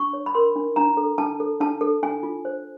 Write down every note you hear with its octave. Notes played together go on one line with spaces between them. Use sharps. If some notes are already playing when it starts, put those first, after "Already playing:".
Already playing: D4 C#6
C#5
B5
A#4 C6
D4
D4 A#5
A4
D4 A5
A4
D4 A5
A4
D4 G#5
F4
C5